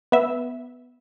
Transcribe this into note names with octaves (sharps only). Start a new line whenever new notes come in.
B3 E5